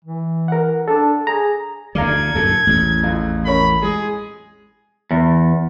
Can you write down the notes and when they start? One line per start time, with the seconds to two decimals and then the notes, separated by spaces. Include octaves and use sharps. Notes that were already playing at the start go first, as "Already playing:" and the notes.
0.05 E3
0.48 A#4 F#5
0.88 D4 A4
1.27 G#4 A#5
1.95 D2 D3 D5 F5 A#5 G#6
2.35 F#2 A#2 A4
2.67 A1 E2
3.03 F2
3.45 C#4 A#4 C#5 B5
3.82 G#3 G#4
5.11 E2